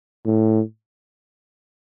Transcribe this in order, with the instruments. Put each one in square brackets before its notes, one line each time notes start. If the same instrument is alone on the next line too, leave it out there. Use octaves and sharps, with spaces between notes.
[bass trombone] A2